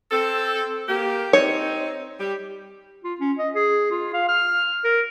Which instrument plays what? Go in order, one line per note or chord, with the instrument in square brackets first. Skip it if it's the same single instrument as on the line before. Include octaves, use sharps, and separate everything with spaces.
[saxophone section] C4 A4
A#3 G4
[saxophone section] C4 D#4 [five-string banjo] C#5
[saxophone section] G3 G4
[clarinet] F4
C#4
D#5
G#4
F4
F5
F6
A#4